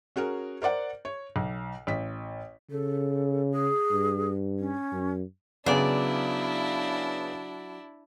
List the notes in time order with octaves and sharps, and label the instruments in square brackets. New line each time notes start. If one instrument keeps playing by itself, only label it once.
[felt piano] C#4 F#4 G#4 A#4
A#4 C5 D5 F#5
C#5
B1
A1 B6
[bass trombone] C#3 [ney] A4
[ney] G#4
[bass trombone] G2
[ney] C#4
[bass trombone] F#2
[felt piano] C#3 B3 G#4 [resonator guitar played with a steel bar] F#3 D5 [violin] D4 E4